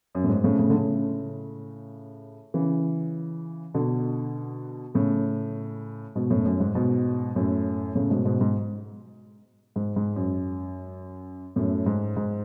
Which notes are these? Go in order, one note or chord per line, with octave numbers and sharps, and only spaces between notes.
F#2
A2
G#2
A2 C#3
A2 C#3
D3
A2 C#3
C#3 E3
B2 D3
A2 C#3
G#2 B2
F#2 A2
F#2
G#2
G#2 B2
F#2 A2
A2 C#3
G#2 B2
G#2 B2
G#2
G#2
G#2
F#2
F#2 A2
G#2
G#2